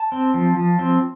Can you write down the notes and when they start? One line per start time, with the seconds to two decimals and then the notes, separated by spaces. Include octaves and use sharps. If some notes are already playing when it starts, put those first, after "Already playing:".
Already playing: A5
0.12 C4
0.34 F3
0.57 F3
0.79 C4